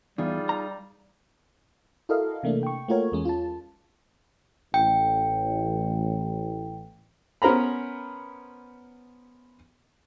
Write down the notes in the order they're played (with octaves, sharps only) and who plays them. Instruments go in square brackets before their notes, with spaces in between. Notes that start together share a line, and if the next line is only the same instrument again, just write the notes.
[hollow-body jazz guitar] E2 [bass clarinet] G3 [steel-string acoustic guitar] D#4 F4 G#4
[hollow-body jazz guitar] A#5
[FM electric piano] E4 F#4 A4 A#4 D#5 F5
C3 E3 A3 A#3 D4
G5 C#6
A3 A#3 F4 F#4 A#4 C#5
E2 G#3 C#4
F4 A5
[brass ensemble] A1 [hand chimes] G5
[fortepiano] B3 C#4 A#4 C5 A#5 B5